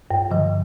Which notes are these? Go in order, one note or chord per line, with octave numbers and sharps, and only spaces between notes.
G2
D3 F3